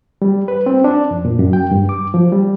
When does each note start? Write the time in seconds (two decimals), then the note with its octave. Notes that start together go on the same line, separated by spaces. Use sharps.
0.22 G3
0.48 B4
0.66 C4
0.84 D4
1.11 F2
1.25 A#2
1.39 F#2
1.53 G5
1.71 G2
1.89 D6
2.14 F3
2.32 G3